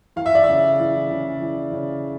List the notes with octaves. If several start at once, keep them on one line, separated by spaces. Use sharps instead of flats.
E3 F5
E5
D5
C#3 E5
E3
C#3
E3
C#3